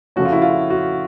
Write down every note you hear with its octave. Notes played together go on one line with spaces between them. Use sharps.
C#3 F3 A3 C#4 F#4
F4
E4
F4
F#4